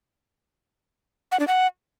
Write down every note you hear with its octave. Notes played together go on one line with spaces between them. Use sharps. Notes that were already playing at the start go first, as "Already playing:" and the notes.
F#5
D4
F#5